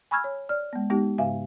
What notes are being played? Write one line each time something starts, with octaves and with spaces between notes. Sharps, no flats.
G#5 B5 C#6 E6 F6 G#6
C#5
D5 F6
G#3 B3
G#3 B3 D#4 G4
G#2 C#3 E5 F5 G#5